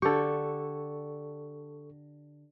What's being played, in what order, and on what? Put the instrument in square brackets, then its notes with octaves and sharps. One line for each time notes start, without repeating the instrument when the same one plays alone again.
[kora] D3 G4 [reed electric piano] A4 C#6